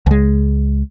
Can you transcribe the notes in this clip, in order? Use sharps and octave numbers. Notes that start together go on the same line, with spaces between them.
C#2 G#3